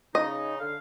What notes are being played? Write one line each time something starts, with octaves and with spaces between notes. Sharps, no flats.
C#3 D#4 D#5
D3 F5